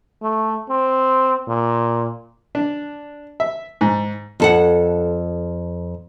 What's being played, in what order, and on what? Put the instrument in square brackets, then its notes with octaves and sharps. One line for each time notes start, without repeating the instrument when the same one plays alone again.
[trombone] A3
C4
A#2
[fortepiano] D4
E5
G#2
[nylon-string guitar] F2 A4 F#5